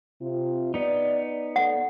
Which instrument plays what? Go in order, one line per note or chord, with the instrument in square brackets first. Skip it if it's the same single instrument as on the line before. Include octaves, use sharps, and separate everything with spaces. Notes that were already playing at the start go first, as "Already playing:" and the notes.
[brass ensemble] C3 F4
[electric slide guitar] B3 D#4 [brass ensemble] D5
[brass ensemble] A4 D5 [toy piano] F#5